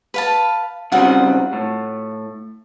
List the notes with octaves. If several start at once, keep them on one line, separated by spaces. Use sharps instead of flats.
B4 F5 A5
C#3 G3 C4 F4 F#4 F#5
A2